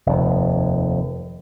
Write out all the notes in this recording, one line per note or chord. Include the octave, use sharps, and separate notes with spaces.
F1 D#2